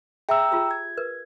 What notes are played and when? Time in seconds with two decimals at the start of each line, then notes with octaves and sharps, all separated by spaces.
0.29 G#4 E5 G5 A#5 E6
0.52 F4 G4 G#4
0.71 G#6
0.97 A#4 B4